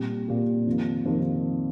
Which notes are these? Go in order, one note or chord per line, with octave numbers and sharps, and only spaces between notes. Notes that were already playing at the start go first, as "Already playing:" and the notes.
Already playing: A#2 G3 C4 G4
A#2 G3 C4 G4
F2 C3 D#3 A#3 F4
F2 C3 D#3 A#3 F4